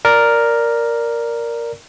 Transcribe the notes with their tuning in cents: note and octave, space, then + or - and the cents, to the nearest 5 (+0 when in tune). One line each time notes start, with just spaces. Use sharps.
A#4 +0 D5 -5